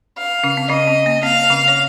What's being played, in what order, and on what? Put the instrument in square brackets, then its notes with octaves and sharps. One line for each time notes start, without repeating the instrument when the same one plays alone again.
[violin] F5
[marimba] C#3 C#4
C4
[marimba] C#3 C#4 [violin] D#5
[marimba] C4
A#3
[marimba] C4 [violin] F5
[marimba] C#3 C#4
C#5